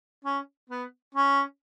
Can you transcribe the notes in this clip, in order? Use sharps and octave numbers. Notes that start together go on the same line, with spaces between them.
C#4
B3
C#4